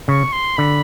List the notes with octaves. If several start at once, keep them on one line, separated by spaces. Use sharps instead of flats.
C#3 C#6
C6
D3 B5